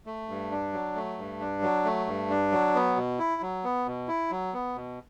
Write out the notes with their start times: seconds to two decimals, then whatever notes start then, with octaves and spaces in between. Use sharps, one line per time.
0.06 A3
0.29 G2
0.52 D4
0.73 F#3
0.96 A3
1.18 G2
1.40 D4
1.62 F#3
1.85 A3
2.07 G2
2.30 D4
2.52 F#3
2.75 B3
2.96 B2
3.19 E4
3.42 F#3
3.64 B3
3.86 B2
4.08 E4
4.31 F#3
4.54 B3
4.76 B2